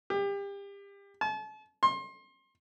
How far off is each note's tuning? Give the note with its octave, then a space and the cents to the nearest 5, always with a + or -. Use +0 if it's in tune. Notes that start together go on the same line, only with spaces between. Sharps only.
G4 +30
A5 -40
C6 +30